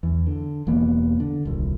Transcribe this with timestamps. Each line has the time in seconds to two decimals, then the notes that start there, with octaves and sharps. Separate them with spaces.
0.03 E2
0.27 D3
0.67 E1 E3 A#3 B3
1.20 D3
1.45 D#1 C2